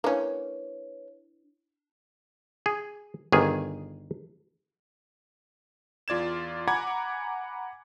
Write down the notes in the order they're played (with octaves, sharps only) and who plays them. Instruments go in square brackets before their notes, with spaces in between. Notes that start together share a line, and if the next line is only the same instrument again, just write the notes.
[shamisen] A#3 C#4 [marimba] D4 E4 [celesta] B4 C#5
[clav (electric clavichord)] G#4
G1 D#3 G#4
[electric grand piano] E2 F4 D5 G#6 E7
F#5 G#5 A#5 B5 D6 G#6